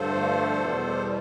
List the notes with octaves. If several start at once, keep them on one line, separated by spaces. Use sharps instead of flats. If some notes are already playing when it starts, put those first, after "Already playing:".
Already playing: G2 D3 F3 A3 A4 C5
E2 B2 G3